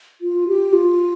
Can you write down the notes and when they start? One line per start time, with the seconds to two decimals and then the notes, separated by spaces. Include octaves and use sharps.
0.21 F4
0.48 G4
0.73 F4